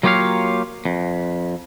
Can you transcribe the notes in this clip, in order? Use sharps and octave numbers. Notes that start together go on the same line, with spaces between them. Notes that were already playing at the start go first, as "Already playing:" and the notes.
F#3 A#3 F4 G4 C#5 F5
F2